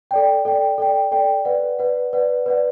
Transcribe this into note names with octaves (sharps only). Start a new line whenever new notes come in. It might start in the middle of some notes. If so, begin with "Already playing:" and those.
A4 D5 G5
A4 D5 G5
A4 D5 G5
A4 D5 G5
B4 D5 F#5
B4 D5 F#5
B4 D5 F#5
B4 D5 F#5